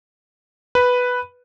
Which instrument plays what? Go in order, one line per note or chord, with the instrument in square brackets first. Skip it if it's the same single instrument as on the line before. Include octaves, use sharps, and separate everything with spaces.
[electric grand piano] B4